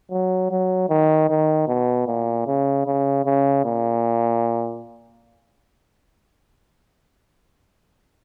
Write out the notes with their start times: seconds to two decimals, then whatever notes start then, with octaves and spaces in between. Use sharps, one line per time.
0.11 F#3
0.51 F#3
0.90 D#3
1.30 D#3
1.68 B2
2.07 A#2
2.47 C#3
2.87 C#3
3.26 C#3
3.65 A#2